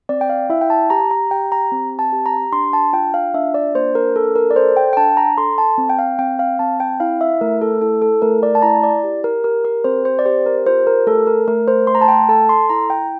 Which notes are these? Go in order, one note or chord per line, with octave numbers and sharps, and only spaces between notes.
C4 D5
G5
F5
E4 E5
G5
A5
G4 A#5
A#5
G4 G5
A#5
C4
A5
G4
A#5
D4 C6
A5
F4 G5
F5
D4 E5
D5
A#3 C5
A#4
D4 A4
A#4
D5
A4 C5
G5
G5
D4 A5
A#5
A4 C6
A5
C4
G5
F5
C4 G5
F5
C4 A5
G5
E4 F5
E5
A3 A#4
A4
E4 A4
A4
A3 A#4
D5
A5
E4 A#5
D5
G4
A#4
G4 A#4
A#4
C4 C5
C5
D5
G4 C5
A#4
F4 C5
A#4
A3 A4
A#4
A3 A#4
C5
A3 C6
A#5
A5
G5
A4 A5
C6
E4 A#5
G5